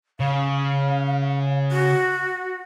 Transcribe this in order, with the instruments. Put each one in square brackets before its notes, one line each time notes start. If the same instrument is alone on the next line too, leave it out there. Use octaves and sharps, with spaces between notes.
[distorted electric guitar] C#3 [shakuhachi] F5
[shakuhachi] F#4